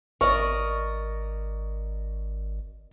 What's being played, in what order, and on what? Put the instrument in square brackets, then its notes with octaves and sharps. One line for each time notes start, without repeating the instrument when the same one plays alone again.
[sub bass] G#1 [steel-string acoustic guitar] A#4 D5 D#5 [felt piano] C#6